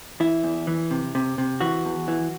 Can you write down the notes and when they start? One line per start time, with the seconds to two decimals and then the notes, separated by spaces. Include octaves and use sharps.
0.20 E3 E4
0.44 E2
0.67 E3
0.91 C3
1.15 C3
1.38 C3
1.61 E3 F#4
1.85 E2
2.08 E3